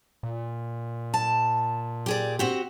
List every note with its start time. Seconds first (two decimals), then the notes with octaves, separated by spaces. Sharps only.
0.23 A#2
1.14 A5
2.06 G4 G#4 D5
2.39 C4 F#4 G4